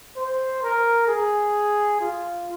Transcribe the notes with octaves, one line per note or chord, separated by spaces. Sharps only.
C5
A#4
G#4
F4